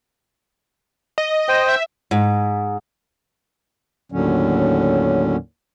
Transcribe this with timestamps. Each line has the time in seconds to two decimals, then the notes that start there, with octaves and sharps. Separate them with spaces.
1.18 D#5
1.48 C5 G5
1.69 E5
2.11 G#2
4.12 D#2 A2 D3 F#3 C#4